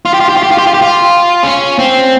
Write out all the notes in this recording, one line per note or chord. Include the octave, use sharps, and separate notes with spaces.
F4
G4
F4
G4
F4
G4
F4
G4
F4
G4
F4
C#4
C4